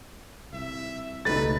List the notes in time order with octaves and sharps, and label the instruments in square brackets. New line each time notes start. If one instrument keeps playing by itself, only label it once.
[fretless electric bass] C2 [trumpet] E5
[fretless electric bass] C#2 B2 G3 [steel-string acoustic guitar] A3 D#4 [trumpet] B4 [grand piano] A6